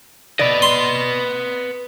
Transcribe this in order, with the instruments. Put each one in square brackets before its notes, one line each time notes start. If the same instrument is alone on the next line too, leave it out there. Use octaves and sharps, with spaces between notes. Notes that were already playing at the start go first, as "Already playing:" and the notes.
[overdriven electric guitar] B4 D#5 [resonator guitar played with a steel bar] D5
[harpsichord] C6